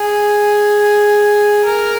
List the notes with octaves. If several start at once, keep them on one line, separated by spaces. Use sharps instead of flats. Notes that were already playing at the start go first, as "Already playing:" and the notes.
Already playing: G#4
A#4